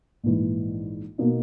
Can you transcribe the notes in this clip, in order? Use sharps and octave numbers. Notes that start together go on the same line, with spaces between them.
A#1 G#2 E3
B2 A#3 D#4